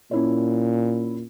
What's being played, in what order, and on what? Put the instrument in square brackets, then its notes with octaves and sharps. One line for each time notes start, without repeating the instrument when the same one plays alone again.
[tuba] A#2 [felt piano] C#4 E4 C#5